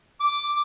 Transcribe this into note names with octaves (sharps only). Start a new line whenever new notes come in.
D6